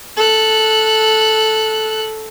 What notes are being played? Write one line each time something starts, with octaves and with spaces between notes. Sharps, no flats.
A4 F#6